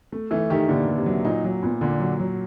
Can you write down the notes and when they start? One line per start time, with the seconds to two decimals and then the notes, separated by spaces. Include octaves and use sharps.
0.12 A3
0.31 E3 A3
0.50 D#3 G4
0.68 A#2 D3
0.88 A#2
0.97 C3
1.06 F#3
1.25 A#2 D#4
1.44 F#3
1.63 A#2 B3
1.81 A#2 D3
2.00 F#3
2.19 F#3